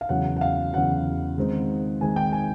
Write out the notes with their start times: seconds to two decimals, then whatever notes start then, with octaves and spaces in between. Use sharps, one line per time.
0.01 F5
0.09 E2 C#3 F#3 F#5
0.37 F#5
0.41 F5
0.73 E2 C#3 F#3 F#5
1.37 D#3 G#3 C4 D#4
2.01 D#3 G#3 C4 D#4 G#5
2.16 G5
2.32 G#5